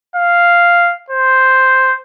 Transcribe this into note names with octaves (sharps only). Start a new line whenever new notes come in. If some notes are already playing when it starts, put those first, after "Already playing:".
F5
C5